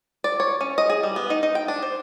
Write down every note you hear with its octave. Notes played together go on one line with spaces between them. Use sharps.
D5
C#5
C#4
D#5
G#4
G3
B3
D#4
D#4
G5
D4
C5